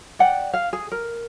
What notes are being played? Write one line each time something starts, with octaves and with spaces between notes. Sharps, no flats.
D5 F#5 G5
F5
G#4
A#4